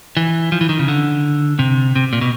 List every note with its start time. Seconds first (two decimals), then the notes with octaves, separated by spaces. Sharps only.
0.17 E3
0.52 F3
0.61 E3
0.69 D#3
0.79 C#3
0.88 D3
1.59 C3
1.96 C3
2.13 A#2
2.21 B2